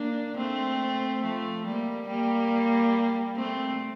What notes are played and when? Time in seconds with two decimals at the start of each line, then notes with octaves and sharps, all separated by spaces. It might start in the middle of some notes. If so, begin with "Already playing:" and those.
Already playing: A#3 D4
0.36 A3 C4
1.22 F3 A3
1.65 G3 A#3
2.08 G3 A#3
3.36 A3 C4